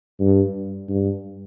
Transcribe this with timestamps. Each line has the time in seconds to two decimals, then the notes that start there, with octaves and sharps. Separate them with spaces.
0.20 G2
0.89 G2